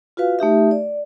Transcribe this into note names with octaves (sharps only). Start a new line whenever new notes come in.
F4 F#4 B4 F5
A3 D#4 G4 E5
D5